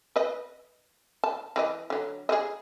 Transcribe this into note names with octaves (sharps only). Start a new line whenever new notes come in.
B4 D#5
A5
E3 G#4 D#5
D3 F#3
G#4 A4 D#5